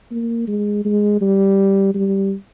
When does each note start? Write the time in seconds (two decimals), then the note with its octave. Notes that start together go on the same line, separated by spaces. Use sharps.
0.11 A#3
0.48 G#3
0.85 G#3
1.21 G3
1.95 G3